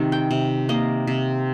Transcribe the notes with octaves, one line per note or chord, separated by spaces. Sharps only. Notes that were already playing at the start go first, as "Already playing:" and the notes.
Already playing: C3 D#3
G5
C3
A#3 D#5
C3